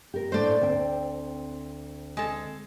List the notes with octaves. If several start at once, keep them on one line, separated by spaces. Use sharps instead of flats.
G4 A#4
A2 A3 D4 C5 D5
D2 C4 G5
G#3 A4